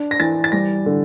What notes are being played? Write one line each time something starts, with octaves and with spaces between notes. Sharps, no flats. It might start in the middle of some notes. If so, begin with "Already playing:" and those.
Already playing: D4
A#6
E3 A6
A6
G3 A#6
D3